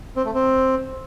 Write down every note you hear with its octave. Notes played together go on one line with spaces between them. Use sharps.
C4
A3
C4